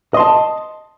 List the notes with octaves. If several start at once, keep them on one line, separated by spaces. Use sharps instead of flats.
D#5 A5 C6